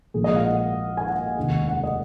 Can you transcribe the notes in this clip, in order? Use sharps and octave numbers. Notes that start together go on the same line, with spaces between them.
A#1 A#2 F3 G#3 G#4
D#5
F5
F#5
G#5
F#5
F1 D#2 C#3 G#3
F#5
D#5